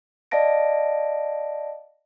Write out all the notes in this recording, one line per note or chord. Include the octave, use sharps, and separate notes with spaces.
D5 D#5 F5 A5 A#6 D7